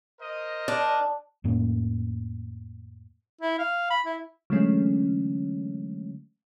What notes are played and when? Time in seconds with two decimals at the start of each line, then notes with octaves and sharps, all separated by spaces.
0.19 A#4 C5 D#5
0.68 D4
1.44 F2 A2 A#3 C#4
3.41 E4
3.59 F5
3.90 B5
4.06 E4
4.50 D3 E3 F#3 G#3 A3 C#4